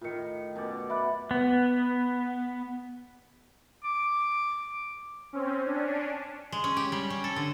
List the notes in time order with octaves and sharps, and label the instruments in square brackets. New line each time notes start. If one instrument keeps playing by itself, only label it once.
[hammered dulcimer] A2 D#3 [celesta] F4 A#4 C#7
[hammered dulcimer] F#2 B2 D5
[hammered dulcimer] D5 F#5 [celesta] E5 B5
[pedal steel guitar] B3
[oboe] D6
[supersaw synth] C4 C#4
C#4 D4
[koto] G#3
C#4
G4
G3
C#4
A4
D3